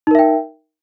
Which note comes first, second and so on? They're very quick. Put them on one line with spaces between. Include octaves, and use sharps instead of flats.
D#4 A#4 E5 G5